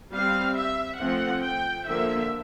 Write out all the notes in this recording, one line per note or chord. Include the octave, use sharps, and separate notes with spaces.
G3 C4 F5
E5
F3 A3 C4 F#5
G5
D3 F3 A#3 E5